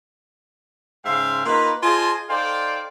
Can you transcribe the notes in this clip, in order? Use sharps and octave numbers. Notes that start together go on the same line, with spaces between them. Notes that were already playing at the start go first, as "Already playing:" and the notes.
G#2 C#3 E5 F5 G5 C6
A#3 D#4 F4 B4
F4 G#4 C5 D#5 G#5 A5
D#4 A4 C5 D5 F5 G5